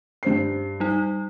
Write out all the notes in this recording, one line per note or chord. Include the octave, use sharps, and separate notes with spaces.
G2 C5 C7
G3 D#4